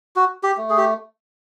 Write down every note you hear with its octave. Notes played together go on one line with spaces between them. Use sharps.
F#4
G4
A3
G#4
G4